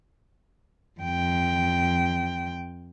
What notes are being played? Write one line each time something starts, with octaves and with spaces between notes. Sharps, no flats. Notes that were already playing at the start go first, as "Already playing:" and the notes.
F2 G5